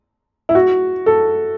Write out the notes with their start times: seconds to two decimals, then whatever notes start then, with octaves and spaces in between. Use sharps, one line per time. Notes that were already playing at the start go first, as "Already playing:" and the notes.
0.49 E4
0.55 F#4
1.06 A4